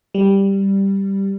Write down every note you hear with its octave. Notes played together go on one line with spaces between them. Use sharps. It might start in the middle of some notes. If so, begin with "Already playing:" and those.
G3